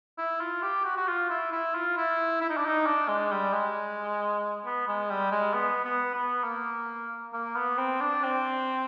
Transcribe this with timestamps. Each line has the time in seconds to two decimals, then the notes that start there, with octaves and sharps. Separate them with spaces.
0.18 E4
0.40 F4
0.62 G4
0.84 F#4
0.97 F#4
1.08 F4
1.30 E4
1.52 E4
1.75 F4
1.97 E4
2.41 E4
2.50 D#4
2.57 D4
2.66 D#4
2.86 D4
3.08 G#3
3.31 G3
3.53 G#3
4.65 B3
4.88 G#3
5.10 G3
5.31 G#3
5.54 B3
5.84 B3
6.14 B3
6.43 A#3
7.33 A#3
7.56 B3
7.78 C4
8.00 D4
8.23 C4